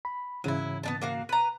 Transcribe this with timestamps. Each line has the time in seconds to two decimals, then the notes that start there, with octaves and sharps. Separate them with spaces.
0.05 B5
0.44 G#2 C#3 E3 F#3 E4
0.83 B3 D4 A5
1.01 A#3 F#4 F5
1.29 B4 A#5